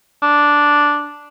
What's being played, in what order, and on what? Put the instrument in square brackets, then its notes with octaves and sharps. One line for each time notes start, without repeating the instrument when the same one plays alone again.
[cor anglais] D4